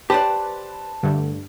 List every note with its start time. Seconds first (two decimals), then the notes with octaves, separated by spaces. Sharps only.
0.10 G4 B4 C5 D5 A5
1.03 G2 D3 A3